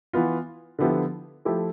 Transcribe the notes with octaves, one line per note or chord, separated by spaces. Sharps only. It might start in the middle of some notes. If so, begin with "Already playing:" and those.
E3 B3 F4
D3 F3 B3 E4 G4
F3 A3 E4 G4